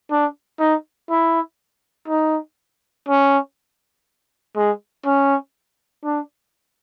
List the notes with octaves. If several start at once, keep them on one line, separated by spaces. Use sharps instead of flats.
D4
D#4
E4
D#4
C#4
G#3
C#4
D4